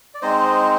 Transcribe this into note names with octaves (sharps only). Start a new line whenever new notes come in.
D5
G#3 C4 D#4 C5 D#5